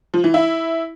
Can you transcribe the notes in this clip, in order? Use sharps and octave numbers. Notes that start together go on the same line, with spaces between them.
F3
E3
E4